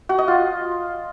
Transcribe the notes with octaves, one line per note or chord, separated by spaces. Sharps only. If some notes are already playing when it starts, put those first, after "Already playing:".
F#4
D#5
F4